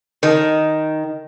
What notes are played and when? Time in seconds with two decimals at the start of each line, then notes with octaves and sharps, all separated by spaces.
0.23 D#3